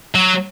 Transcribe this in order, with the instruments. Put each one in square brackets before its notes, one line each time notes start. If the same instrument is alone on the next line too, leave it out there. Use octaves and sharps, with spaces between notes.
[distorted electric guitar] F#3